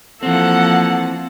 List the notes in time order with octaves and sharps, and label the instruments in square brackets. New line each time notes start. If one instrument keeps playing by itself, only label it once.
[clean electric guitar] E3 C4 [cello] F3 A#3 [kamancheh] A4 F#5